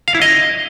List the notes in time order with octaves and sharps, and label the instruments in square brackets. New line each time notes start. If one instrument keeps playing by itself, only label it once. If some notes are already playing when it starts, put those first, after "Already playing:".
[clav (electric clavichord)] F5
E4
D#5